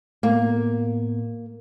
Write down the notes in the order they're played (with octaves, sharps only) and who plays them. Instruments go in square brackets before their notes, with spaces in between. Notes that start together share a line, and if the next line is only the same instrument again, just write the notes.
[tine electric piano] A2 B3 [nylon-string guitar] A#3